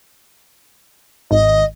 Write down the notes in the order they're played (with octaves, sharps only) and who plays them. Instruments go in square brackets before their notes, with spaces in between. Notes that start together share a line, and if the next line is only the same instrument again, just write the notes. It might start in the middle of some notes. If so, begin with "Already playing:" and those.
[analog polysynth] G#1 [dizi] D#5